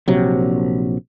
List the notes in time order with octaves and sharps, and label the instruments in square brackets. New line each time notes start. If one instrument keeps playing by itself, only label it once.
[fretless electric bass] A#1 C3 F#3